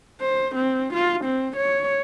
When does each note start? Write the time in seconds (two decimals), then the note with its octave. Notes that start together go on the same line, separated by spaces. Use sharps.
0.21 C5
0.55 C4
0.94 F4
1.25 C4
1.57 C#5